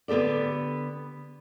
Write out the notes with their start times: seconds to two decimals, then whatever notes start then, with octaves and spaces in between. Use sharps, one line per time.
0.08 D3 B3 G4 A4 D5